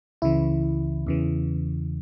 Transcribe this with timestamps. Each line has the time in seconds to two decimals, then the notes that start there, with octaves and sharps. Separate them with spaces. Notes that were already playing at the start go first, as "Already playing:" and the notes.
0.22 C#2 C#3 E3 E4
1.07 E2 C#3 E3